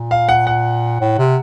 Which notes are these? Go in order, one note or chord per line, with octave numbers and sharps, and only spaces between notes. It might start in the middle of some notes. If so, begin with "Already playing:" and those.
Already playing: A#2
F5
F#5
F#5
A2
C3